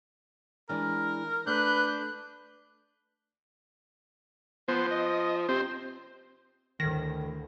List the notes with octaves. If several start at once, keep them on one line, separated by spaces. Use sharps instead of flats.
E3 G#3 D4 A#4
A3 D4 B4 F#6 G6
F3 B3 C5
D#5
C3 C4 C5
D2 A2 D#3 A#6